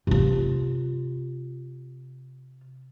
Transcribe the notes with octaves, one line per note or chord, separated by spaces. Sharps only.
C3 F4